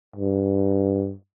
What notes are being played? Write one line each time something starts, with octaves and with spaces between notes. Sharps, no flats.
G2